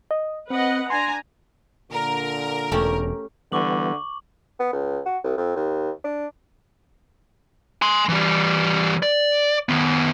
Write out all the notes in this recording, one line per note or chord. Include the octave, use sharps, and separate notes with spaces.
D#5
C4 B4 D#5 F#5
D4 G#5 A#5 C6
A#2 D3 A#4
E1 A3 C#4 G4
D3 E3 G3 B3 C#6 D6 F#7
B3
C#2
F#4
C2
F2
D#2
D4
G#5 C6
E3 G3
D5
D#3 B3